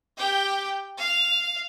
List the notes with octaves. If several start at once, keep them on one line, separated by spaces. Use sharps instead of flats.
G4 G5
F5